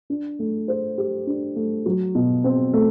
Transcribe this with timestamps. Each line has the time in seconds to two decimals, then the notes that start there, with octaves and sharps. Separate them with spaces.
0.10 D4
0.39 A3
0.68 C5
0.98 G4
1.27 D4
1.56 A3
1.86 F#3
2.15 B2
2.44 C4
2.73 A3